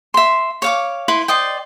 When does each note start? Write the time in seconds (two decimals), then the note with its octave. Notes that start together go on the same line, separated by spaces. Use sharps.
0.14 E5 C6
0.62 C#5 F5 D6
1.08 E4 B4 B5 C6
1.28 C5 D5 D#5 G5